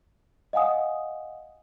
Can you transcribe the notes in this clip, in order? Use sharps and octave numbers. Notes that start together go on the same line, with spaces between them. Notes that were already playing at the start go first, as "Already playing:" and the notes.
D#5 F5 F#5 G#5 D#6